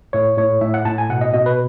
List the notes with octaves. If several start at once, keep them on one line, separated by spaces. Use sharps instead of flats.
A2 C#5
A2 C#5
A2 E5
F#5
A2 A5
G#5
B2 F#5
D#5
B2 D#5
B4